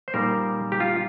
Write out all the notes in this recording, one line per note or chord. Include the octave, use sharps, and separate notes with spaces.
C5
A#2 G3 D#4 A#4
G4
F4